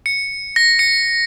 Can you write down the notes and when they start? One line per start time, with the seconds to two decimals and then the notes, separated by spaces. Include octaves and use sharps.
0.06 C#7
0.56 A#6
0.79 C#7